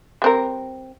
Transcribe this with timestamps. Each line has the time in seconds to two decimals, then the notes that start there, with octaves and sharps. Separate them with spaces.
0.22 G3 C4 A#4